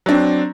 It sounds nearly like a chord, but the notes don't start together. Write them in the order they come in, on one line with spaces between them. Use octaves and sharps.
F#3 D4 C4